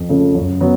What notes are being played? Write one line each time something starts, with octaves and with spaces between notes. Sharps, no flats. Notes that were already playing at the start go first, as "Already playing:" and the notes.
Already playing: F2
C#3 F3 A3
F#2
F#3 B3